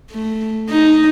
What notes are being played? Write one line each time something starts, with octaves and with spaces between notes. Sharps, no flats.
A3
D#4